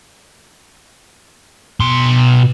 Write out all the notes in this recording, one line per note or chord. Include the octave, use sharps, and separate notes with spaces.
B2 C6